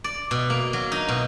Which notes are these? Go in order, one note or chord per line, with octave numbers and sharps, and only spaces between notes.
D5
B2
A#3
F#3
D#4
B2